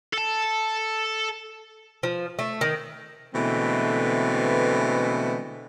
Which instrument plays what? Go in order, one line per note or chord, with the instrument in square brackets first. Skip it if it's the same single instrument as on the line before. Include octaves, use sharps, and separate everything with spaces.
[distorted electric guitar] A4 A5
[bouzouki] F3
A3
D#3
[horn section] B2 D3 E3 G#3 A3 C4